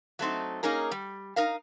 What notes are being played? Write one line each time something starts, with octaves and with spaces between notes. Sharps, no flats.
F#3 A3 C4 D#4
A#3 C#4 D#4 G#4 A#4
G3
D#4 A#4 F5